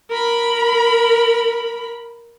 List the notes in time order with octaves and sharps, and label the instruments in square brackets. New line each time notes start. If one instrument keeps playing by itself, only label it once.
[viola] A#4 B5